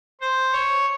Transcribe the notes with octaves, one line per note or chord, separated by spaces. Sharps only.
C5
C#5